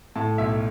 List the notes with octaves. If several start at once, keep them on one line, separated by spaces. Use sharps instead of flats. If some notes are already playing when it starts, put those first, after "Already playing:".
A2 A5
B1 E5